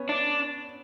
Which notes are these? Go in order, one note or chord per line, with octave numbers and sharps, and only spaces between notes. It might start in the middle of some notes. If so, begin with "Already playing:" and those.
Already playing: B3 C#4
D4